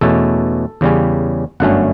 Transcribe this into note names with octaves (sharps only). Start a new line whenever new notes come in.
E2 B2 A3 C#4 A4
E2 C#3 G3 C#4
G1 F#2 D3 A3 C#4 F#5